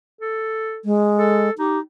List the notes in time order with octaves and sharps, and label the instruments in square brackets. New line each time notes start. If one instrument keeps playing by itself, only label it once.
[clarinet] A4
[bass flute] G#3
[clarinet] A4
[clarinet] D#4 [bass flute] G4